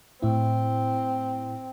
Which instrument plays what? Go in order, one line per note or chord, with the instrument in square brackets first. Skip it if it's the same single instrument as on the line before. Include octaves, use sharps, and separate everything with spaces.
[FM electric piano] A2 E4 [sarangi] C4